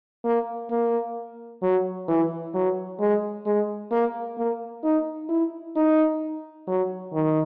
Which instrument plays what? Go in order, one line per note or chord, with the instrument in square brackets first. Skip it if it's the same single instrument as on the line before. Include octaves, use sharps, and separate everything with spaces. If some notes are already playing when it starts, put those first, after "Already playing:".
[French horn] A#3
A#3
F#3
E3
F#3
G#3
G#3
A#3
A#3
D#4
E4
D#4
F#3
D#3